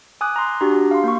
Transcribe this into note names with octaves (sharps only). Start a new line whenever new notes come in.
G#5 D6 D#6 F#6
A#5 C6
D4 F#4 G4 A#5
F5 C6
A#3 C#6